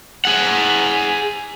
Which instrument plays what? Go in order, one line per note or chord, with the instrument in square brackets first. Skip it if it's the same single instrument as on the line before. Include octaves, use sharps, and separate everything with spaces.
[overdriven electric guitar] G#4 F#5